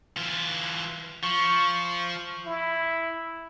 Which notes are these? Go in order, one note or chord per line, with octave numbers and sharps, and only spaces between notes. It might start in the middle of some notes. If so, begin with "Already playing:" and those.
E3 F4
F3 C#6
E4